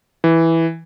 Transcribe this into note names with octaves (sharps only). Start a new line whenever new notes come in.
E3